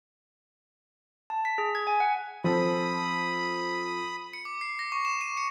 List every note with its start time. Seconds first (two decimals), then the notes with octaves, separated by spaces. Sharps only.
1.30 A5
1.45 B6
1.58 G#4
1.75 G#6
1.87 G#5
2.00 F#5
2.44 F3 C4 A4 B5 D#6
4.33 C#7
4.45 D6
4.61 C7
4.79 A#6
4.92 C#6
5.05 E7
5.21 D#7
5.37 C#7